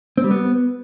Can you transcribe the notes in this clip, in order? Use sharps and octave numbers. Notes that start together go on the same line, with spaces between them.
C4
G3
B3